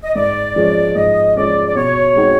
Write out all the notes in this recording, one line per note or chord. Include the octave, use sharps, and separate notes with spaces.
D#5
G#2 D5
F3 G#3 C#4
G#2 D#5
F3 G#3 C#4 D5
D5
B2 C#5
G#3 C4 D#4 F#4